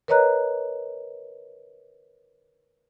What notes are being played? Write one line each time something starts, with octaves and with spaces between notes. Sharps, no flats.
A#4 B4 C#5 D#5 A#5 F#6